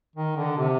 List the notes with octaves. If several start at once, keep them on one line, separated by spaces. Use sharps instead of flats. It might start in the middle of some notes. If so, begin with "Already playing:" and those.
D#3
D3
C3